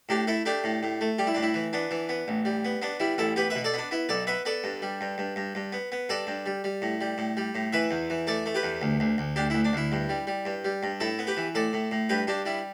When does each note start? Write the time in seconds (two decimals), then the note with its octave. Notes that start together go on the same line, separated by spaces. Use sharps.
0.09 A2 D4 G4
0.27 A3 E4 A4
0.45 A3 D4 G4
0.64 A2
0.83 A2
1.01 A3
1.18 G3 G4
1.27 E4
1.35 A2 D4
1.43 E4
1.54 E3
1.73 B3 D4
1.91 E3
2.09 B3
2.28 A1
2.45 G3
2.65 B3
2.82 B3 D4
3.00 G3 E4
3.18 A1 E4 A4
3.36 B3 G4 B4
3.50 B4 E5
3.55 B2
3.64 A4 D5
3.74 B3 D4
3.91 B3 E4
4.09 B1 A4 D5
4.27 B3 B4 E5
4.45 B3 A4 D5
4.64 G2
4.82 G3
5.01 G2
5.18 G2
5.36 G2
5.55 G2
5.72 B3
5.92 B3
6.09 G2 A4 D5
6.27 G2
6.46 G3
6.64 G3
6.82 A2
7.01 G3
7.18 A2
7.37 G3
7.55 A2
7.73 E3 B4 E5
7.91 E2
8.10 E3
8.27 A3 A4 D5
8.46 A3
8.55 G4 B4
8.63 E2
8.82 D2
9.00 D2
9.18 D2
9.36 D2 D4 G4
9.50 D2 E4
9.65 D4
9.73 D2 E4
9.92 G2
10.09 G3
10.27 G3
10.45 G2
10.65 G3
10.83 G2
11.00 A2 E4 A4
11.19 B3
11.27 G4 B4
11.37 E3
11.55 A2 A4 D5
11.73 A2
11.91 A2
12.09 G2 G4 B4
12.27 G2 D4 G4
12.45 G3 E4